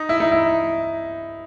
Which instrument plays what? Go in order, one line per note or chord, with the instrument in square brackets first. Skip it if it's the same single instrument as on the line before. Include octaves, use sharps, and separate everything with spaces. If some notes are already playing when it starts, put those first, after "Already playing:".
Already playing: [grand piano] D#4
E4
D#4
E4